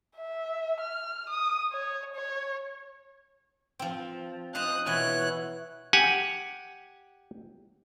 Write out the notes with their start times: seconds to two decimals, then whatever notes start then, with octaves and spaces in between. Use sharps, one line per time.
0.17 E5
0.80 F6
1.29 D#6
1.72 C#5
2.15 C#5
3.79 F3 C4
4.55 C5 D#5 F5 D#6 F#6
4.86 B2 E3 E4 C#5 F#6
5.93 G4 F#5 G#5